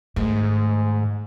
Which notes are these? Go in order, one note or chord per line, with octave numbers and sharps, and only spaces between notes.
G#2 D#3 A3